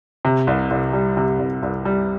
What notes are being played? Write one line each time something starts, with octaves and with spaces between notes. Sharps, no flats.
C3
C2
C2
G3
C3
C2
C2
G3